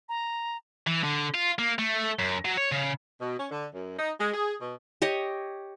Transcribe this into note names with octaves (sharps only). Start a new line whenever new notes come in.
A#5
E3
D3
F4
A#3
A3
F#2
F#3
C#5
C#3
B2
C#4
D3
F#2
D#4
G#3
G#4
B2
G4 C#5 D#5